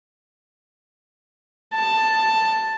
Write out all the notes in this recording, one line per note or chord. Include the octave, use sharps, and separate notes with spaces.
A5